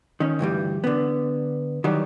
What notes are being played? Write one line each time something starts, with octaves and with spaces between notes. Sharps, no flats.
D#3 C#4
D2 G2 E3 G3
D3 B3
D#3 E3 F#3 G3